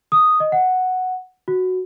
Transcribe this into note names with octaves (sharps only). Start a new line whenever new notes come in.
D#6
D#5
F#5
F#4